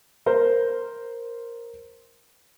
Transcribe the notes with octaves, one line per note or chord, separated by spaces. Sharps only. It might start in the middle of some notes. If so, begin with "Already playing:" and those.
A#4 C5